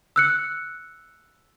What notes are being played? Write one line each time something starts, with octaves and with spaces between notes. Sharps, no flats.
E6 F#6 C#7